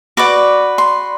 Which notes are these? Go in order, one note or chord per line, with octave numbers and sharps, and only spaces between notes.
F#4 B4 D5 D6
C6